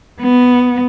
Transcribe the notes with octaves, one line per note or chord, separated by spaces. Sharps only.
B3